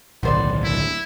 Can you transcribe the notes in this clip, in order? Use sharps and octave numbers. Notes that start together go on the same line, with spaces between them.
D1 B1 D#3 B3 C5 D5
E4